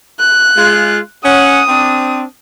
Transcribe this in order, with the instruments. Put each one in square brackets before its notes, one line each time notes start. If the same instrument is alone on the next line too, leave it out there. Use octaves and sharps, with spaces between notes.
[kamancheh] F#6
[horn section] G#3 F4
[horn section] C#4 F#5 [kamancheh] D#6
[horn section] C4 D4